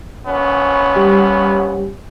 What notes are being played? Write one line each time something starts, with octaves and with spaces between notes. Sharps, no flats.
A#1 B3 C#4
G3 G4